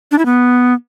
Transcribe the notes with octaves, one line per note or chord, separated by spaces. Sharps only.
D4
E4
B3